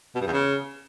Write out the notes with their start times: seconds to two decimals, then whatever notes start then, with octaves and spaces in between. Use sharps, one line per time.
0.15 B2
0.21 G2
0.27 E2
0.33 C#3